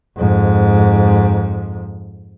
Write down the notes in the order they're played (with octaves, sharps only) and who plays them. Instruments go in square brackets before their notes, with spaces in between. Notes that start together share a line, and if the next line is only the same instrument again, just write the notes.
[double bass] F2 G#2